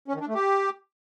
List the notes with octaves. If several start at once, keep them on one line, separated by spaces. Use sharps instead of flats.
C#4
D#3
D4
A3
G4